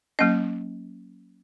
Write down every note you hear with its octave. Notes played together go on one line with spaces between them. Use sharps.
F#3 A#3 C#4 D#5